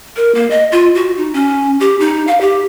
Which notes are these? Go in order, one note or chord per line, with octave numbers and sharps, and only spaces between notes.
A#4
A#3
D#5
F4
F#4
D#4
C#4
G4
D#4
F5
G4